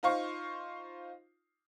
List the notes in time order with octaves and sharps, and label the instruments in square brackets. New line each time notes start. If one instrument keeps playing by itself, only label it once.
[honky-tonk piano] D#4 F4 C5 F5 C#6